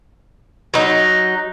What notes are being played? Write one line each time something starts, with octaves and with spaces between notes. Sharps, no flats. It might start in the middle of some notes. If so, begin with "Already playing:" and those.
F#3 D#4